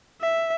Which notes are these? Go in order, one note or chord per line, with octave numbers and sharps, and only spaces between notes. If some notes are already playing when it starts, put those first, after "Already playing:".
E5